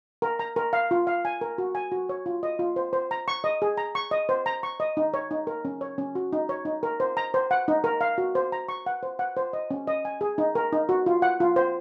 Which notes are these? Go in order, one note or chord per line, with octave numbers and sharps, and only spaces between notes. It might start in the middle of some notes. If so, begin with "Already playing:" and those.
A#4
A#5
A#4
F5
F4
F5
G#5
A#4
F#4
G#5
F#4
C#5
F4
D#5
F4
C5
C5
A#5
C#6
D#5
G#4
A#5
C#6
D#5
C5
A#5
C#6
D#5
D#4
C#5
D#4
A#4
C#4
C#5
C#4
F#4
D#4
C#5
D#4
A#4
C5
A#5
C5
F#5
D#4
A#4
F5
F#4
C5
A#5
C#6
F#5
C5
F#5
C5
D#5
C#4
D#5
G#5
G#4
D#4
A#4
D#4
F#4
F4
F#5
F4
C5